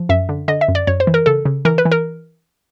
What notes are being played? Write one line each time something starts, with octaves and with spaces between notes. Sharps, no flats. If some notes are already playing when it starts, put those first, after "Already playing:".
Already playing: F3
F#2 E5
D3
D3 D#5
E5
F#2
D5
F#2 C#5
C5
E3
A#4
C#3 A4
C#3
E3 A#4
B4
E3
A#4